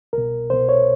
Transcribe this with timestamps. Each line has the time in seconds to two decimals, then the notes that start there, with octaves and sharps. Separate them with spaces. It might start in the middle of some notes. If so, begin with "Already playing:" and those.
0.13 C2 B2 A#4
0.50 C2 B2 C5
0.69 C#5